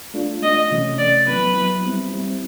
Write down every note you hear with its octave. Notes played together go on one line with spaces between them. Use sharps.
A3 D4 F4
A3 D4 F4 D#5
C3 E3 A3 C#4
C3 E3 A3 C#4 D5
F#3 B3 E4 B4
F#3 B3 E4
G3 C4 E4
G3 C4 E4